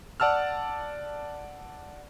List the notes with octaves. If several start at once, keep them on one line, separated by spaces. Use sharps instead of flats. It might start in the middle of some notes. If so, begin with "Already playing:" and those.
D5 F#5 A5 E6 F6